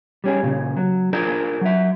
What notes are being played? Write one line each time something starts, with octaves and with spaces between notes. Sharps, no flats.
G3 C#4 G#4
A#2 C#3
F#3
D4 F4 G#4 A#4 C5 D5
F#3 E5